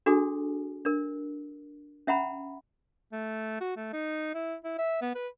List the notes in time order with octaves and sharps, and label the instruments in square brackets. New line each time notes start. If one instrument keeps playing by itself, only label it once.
[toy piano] D4 F#4 G#4 A4 G#5
D4 A#4
C#4 E5 F#5 A#5 B5
[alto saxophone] A3
F#4
A3
D#4
E4
E4
E5
B3
B4